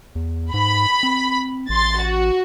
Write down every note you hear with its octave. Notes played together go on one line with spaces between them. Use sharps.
E2
G#2 B5
C4
A1 C6 A6
F#4